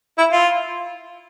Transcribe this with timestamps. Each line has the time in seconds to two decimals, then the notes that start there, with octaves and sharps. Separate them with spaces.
0.18 E4
0.32 F4